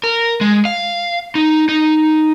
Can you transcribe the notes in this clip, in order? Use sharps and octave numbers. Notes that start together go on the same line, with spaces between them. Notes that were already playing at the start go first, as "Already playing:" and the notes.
A#4
G#3
F5
D#4
D#4